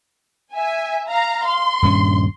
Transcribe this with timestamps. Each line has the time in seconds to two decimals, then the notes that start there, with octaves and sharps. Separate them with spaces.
0.53 E5 G#5
1.08 F5 A#5
1.47 C6
1.82 D#1 G2 C#4